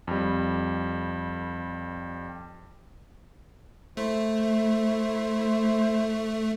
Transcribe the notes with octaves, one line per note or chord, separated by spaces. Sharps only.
F2 G3
A3 E4 C5